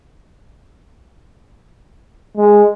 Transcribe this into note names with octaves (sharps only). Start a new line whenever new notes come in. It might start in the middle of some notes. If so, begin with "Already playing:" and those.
G#3